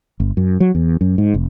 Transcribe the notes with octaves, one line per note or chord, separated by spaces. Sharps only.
G1
F#2
F#3
E2
F#2
G#2
F1